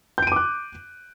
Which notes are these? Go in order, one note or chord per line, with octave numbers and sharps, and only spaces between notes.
D6 F#6 G6 D7 D#7